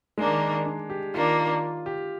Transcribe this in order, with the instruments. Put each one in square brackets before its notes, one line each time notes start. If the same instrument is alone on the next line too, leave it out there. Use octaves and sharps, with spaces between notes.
[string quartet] D#3 A#3 D4 [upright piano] G#3
[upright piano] D4
G4
[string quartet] D#3 A#3 D4 [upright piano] F4
[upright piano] G4